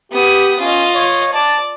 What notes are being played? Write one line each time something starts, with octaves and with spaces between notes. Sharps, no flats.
B3 G4 D#6
C#4 F4 D#5
C#5
D5 A5